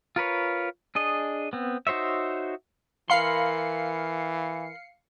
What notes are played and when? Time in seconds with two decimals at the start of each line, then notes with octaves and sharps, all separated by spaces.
0.16 F4 A#4 B4 C#5
0.95 D4 G#4 D#5
1.53 B3 C4
1.87 D#4 F#4 C5 C#5 E5
3.10 E3 A#4 F5 B5 C6 C7 C#7